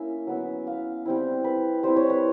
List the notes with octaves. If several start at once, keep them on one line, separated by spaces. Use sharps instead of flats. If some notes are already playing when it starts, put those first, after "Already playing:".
Already playing: A#3 C#4 E4 E5
F#3 B3 E4
F5
G3 C4 E4
B4
G3 C4 E4 C5
C#5
B4